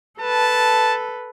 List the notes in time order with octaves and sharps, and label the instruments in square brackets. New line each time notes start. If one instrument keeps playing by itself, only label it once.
[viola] A4 B4 [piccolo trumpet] A5